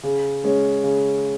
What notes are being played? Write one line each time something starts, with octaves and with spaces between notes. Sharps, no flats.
C#3
G#3 C#4
C#3